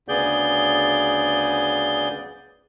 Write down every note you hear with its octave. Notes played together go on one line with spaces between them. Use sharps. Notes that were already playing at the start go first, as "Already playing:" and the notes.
D2 C#3 B3 G#4 D5 G6